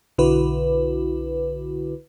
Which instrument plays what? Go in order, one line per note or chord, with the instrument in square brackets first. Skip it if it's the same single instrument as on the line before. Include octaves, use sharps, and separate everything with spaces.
[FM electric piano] B1 D3 E4 F#4 B4